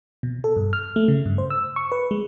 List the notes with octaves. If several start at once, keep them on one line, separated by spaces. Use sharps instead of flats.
B2
A4
G2
F6
A3
C#3
G2
C5
E6
C#6
B4
G#3